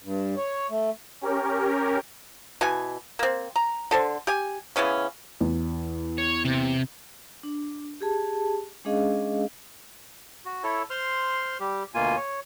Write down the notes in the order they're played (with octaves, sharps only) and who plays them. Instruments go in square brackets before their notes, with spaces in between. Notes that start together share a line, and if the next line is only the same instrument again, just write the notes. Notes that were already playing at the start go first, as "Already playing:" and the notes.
[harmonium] G2
C#5
A3
[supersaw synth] C#4 G4 A#4
[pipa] B2 E3 G#5
A#3 C4
A#5
D3 A4 C5
G4 G#5
C#3 E3 B3 C#4
[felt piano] E2
[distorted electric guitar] C#5
C3
[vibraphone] D4
G4 G#4 A5
G#3 C#4 D4 G#4 D#5 F5
[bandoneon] F#4
E4 A4 C#5
C5 C6 F6
G3 G4
D2 B2 A#3 F4 G#5
C#5